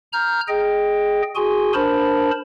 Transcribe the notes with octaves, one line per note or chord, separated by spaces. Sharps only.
A#5 F6 G6
G#4 D#5 G5
F#4 G#4 G#5 C6
D4 A#4 C5 A5 B5